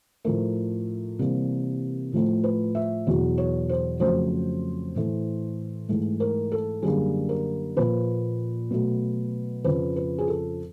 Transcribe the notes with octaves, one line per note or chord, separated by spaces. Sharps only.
A2 F3 A3 A#4
C3 E3 G3 A#3
A2 F3 A3
B4
E5
E2 B2 F#3
C#5
C5
F2 C#3 F#3 A3 C5
A2 E3 A3
G#2 E3 A3
A#4
A4
F#2 D3 G3 A#3 G#4
A#4
A#2 F3 A#3 B4
B2 F#3 A3
F2 C#3 F3 B4
B4
G#4
A4